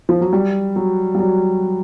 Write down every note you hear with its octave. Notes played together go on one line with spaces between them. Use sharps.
F3
F#3
G3
F#3
G3
F#3